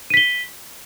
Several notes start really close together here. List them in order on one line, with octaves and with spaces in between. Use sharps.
D#7 B6 G7